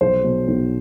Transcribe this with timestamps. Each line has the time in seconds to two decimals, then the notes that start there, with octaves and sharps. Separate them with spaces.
0.01 B1 C5
0.24 B2 F#3
0.48 B1